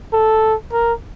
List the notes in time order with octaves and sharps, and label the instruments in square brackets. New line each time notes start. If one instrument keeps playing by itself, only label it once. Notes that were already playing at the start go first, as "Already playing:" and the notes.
[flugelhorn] A4
A#4